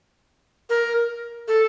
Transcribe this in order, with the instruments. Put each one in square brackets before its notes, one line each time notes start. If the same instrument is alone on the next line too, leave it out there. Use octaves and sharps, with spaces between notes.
[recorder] A#4
A4